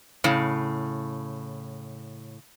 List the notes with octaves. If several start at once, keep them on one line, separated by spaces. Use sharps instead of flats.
A2 C#3